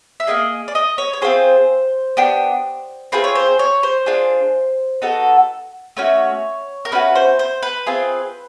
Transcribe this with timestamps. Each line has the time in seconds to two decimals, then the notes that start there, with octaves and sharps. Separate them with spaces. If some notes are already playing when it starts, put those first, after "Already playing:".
0.20 E5
0.27 A#3 D#4 G#4 D#5
0.68 D5
0.75 D#5
0.98 C#5
1.13 C#5
1.22 C4 F4 G#4 C5
2.17 B3 D4 G4
3.12 C4 F4 G#4 B4
3.24 C#5
3.35 C5
3.59 C#5
3.83 C5
4.06 D4 F4 G#4
5.02 B3 D#4 F#4 A4
5.97 A3 C#4 F#4 C#5
6.85 A#4
6.92 A3 C#4 F#4 B4
7.15 C5
7.39 C5
7.63 B4
7.86 C4 F4 G#4